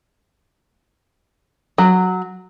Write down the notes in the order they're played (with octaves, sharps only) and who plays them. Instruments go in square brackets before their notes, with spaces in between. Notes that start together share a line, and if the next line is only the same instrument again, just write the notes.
[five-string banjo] F#3